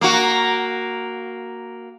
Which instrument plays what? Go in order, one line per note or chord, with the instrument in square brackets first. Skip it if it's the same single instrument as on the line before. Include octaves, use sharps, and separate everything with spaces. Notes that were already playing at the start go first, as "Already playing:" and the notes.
[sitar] A#3 F#4